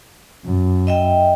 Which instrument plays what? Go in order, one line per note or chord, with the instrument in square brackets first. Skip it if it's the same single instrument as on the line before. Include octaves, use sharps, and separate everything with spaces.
[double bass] F#2
[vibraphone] D#5 E5 G5